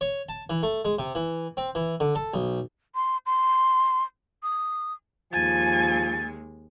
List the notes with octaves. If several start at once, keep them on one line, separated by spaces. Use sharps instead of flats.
C#5
A5
E3
A3
G#3
C3
E3
C4
E3
D3
A4
B1
C6
C6
D#6
D#2 F3 G#3 G#5 A6